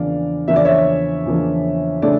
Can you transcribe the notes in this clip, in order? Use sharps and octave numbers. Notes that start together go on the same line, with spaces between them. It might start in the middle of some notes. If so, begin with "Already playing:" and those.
Already playing: E2 C#3 F3 A#3 D4 D5 F5
E2 C#3 F3 A#3 D4 E5
D5
C#5 E5
E2 C#3 F3 A#3 D4
C#3 E3 A3 D4 D5